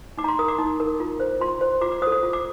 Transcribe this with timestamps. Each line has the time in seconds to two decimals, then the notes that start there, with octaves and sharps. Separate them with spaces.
0.18 D#4 D6
0.24 A#5
0.28 C6
0.39 A#4 D#6
0.48 D6
0.58 D#4
0.80 A#4
1.00 F4
1.20 C5
1.41 F4 C6
1.61 C5
1.81 F4 D6
1.92 D6
2.02 C5 D#6
2.07 A4
2.12 D#6
2.23 F4
2.33 D6